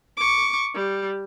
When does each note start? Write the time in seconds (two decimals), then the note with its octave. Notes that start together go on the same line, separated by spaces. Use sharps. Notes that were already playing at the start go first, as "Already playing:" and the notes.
0.17 C#6 D6
0.74 G3